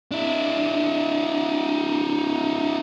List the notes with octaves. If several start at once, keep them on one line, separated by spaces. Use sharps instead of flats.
D4 E4